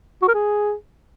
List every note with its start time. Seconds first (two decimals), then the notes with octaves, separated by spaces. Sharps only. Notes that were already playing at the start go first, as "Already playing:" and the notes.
0.22 F#4
0.28 A#4
0.34 G#4